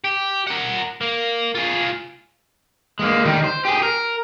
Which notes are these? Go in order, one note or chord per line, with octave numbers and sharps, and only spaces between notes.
G4
A#4 F#5
A#3
F4 G#4
G#3 A#3
D#3 G3
C5
G4 G#4
A#4